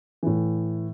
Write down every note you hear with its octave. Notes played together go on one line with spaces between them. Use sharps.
A2 E3